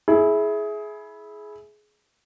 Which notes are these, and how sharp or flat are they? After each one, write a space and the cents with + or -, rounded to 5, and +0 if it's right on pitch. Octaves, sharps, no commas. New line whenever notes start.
E4 -10 G#4 +20